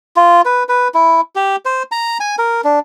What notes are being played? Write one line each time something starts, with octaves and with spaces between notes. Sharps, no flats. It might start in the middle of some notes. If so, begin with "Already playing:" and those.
F4
B4
B4
E4
G4
C5
A#5
G#5
A#4
D4